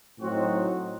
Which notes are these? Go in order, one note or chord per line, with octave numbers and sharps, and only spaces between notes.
A2 F#3 C4 D#4 F#4